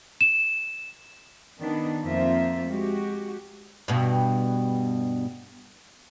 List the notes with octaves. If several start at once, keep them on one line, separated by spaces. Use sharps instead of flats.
E7
D#3 B3 D4
F2 A#3 F4 C5 E5
G#3 F#4 G4
G2 B2